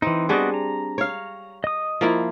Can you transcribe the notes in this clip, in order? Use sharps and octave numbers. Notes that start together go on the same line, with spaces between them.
E3 C4 D#4
G3 B3 D4 F#4 G#4 D#5
A#5
C#5 F5
D#5 D#6
F3 A#3 E4